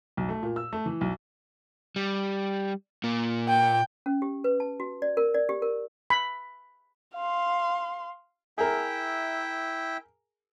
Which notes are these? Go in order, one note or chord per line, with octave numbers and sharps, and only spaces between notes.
B1
A3
A#2
E6
A3
E3
B1
G3
A#2 A#3
G5
C#4
G4
B4
A5
F#4
D5
A#4
D5
G4
A#4
B5
F5 C6
E4 G#4 A#4 E5 G5